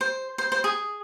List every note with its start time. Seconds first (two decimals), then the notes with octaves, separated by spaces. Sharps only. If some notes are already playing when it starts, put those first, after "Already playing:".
0.01 C5
0.38 C5
0.52 C5
0.64 G#4